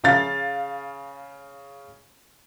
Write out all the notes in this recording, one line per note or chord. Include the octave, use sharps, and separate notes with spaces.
C#3 F5 A6